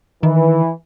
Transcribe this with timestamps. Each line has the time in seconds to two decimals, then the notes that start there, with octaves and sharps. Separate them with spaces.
0.23 D#3 E3